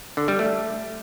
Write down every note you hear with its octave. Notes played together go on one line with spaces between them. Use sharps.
D3
G3
A3